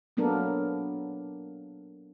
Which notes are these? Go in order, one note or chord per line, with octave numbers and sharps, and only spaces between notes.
F#3 A#3 B3 D4 A4 A#4